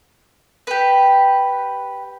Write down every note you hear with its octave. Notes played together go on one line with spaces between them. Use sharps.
G4 B4